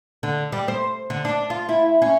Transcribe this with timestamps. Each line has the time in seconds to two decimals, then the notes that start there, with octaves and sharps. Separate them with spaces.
0.23 D3
0.52 G3
0.68 C5
1.10 D3
1.25 D4
1.50 F4
1.69 E4
2.02 C#4